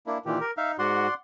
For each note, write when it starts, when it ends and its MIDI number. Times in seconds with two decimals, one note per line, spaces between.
0.06 0.18 58
0.06 0.18 62
0.06 0.18 64
0.26 0.39 46
0.26 0.39 51
0.26 0.39 52
0.26 0.46 67
0.41 0.51 70
0.57 0.77 63
0.57 0.72 76
0.57 0.72 77
0.79 1.07 44
0.79 1.07 66
0.79 1.14 74
0.79 1.14 78
0.79 1.14 84